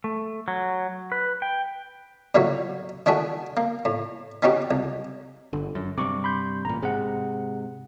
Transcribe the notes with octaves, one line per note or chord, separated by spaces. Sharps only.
A3
F#3
B4
G5
A#2 D3 F#3 E4 F#4
D#3 A3 D4 E4 F#4 G#4
A#3
A2
B3 C#4 D#4 F#4 G4
C2
G1 D3
F#2
G2 C3 C#6 D6
B5 C6 G6
A1 A#2 A#5
G#2 C3 G#4 F#5